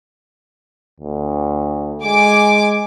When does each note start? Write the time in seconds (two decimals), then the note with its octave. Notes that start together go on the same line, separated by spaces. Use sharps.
1.00 D2
2.04 G#3 G#5 D6